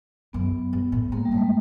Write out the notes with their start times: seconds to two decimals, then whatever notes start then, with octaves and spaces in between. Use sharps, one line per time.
0.33 F#2 B3
0.73 G2
0.92 A2
1.12 G#2 A#3
1.25 G3
1.32 G#2 A3
1.37 G#3